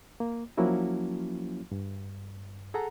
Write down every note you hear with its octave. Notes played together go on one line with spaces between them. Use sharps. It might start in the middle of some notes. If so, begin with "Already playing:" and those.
A#3
F3 F#3 A#3 C#4 E4 F#4
G2
G#4 A4 F#5 A#5